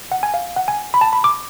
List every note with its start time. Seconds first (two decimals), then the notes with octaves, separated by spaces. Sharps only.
0.12 F#5
0.23 G#5
0.34 F5
0.56 F#5
0.68 G#5
0.94 B5
1.01 A5
1.13 B5
1.24 D6